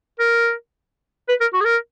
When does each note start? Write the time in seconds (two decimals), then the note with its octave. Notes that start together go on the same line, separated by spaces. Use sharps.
0.19 A#4
1.29 B4
1.41 A#4
1.53 F#4
1.61 G#4
1.65 A#4